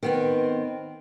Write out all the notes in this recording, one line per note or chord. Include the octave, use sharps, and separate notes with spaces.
D#3 B3 C4